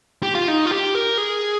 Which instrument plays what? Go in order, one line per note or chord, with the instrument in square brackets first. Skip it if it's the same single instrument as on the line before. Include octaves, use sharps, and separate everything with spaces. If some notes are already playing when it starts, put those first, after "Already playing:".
[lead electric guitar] G4
F4
D#4
F4
G4
A#4
G#4